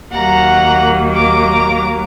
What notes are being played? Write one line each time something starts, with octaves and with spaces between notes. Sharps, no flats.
D#2 D#3 F#3 A#3 F#5 A#5
A#5 D6